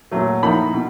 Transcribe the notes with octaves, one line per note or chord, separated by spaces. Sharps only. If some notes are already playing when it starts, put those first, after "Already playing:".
A#2 F#3 A3
A2 F3 A#3 D#4 B5
B2